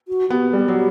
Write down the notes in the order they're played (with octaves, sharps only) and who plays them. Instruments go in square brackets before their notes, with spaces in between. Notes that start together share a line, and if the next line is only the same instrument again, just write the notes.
[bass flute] F#4
[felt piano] B3 [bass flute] G4
[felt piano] G3 [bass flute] G4
[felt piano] F#3